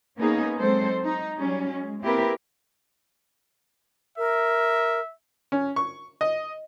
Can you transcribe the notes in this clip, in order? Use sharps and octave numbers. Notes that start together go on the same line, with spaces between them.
A#3 B3 C#4 D#4 G#4
F#3 G#3 C4 A4 C5
D#4
F#3 G3 C#4
G#3
A#3 C4 E4 G4 A#4 B4
A#4 E5
C#4
C#6
D#5